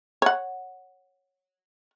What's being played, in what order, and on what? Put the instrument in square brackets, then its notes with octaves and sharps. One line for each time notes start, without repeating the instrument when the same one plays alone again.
[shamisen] C#5 F#5